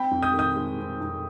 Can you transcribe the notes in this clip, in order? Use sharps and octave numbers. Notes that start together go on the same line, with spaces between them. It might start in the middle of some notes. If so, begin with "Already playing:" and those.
Already playing: C4 G5 B5
F2
D#6 G6
D#3
D#6 G6
G#3
C4
F2